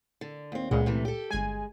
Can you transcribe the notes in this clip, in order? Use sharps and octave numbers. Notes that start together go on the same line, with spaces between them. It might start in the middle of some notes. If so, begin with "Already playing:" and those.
D3
D#2 C4
C#2 A#2 G#3 B3
C3 E3 A3
G4 A4
G1 G#3 G#5